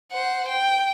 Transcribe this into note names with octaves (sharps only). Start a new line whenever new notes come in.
C5 F#5
G5